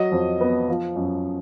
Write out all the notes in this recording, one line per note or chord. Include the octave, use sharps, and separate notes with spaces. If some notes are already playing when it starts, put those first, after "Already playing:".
Already playing: F#3 D#5
F2
B3
F3
F#2